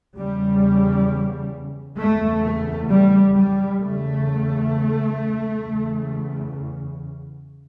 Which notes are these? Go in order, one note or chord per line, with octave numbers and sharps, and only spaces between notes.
E2 C#3 G3
E2 C#3 A3
A3
G3
G3
E2 C#3 A3
E2 C#3